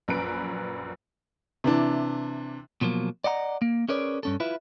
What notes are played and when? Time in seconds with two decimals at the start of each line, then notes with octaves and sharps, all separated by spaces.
0.08 A#1 F#2 B4 D7
1.64 C3 E3 D4
2.81 B2 F3 F#3 A#3
3.24 D5 D#5 F#5 A#5
3.62 A#3
3.89 C#4 G#4 A#4 B4 C#5 D5
4.23 G2 C#4 A4
4.40 E4 F4 B4 E5